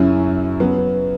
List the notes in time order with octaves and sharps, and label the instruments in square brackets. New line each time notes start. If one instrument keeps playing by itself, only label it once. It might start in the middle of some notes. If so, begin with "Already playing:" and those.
Already playing: [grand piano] F#2 C#3 F#3 C#4 E4
C#3 F#3 B3